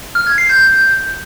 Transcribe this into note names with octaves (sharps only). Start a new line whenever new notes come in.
F6
G#6
C7
G6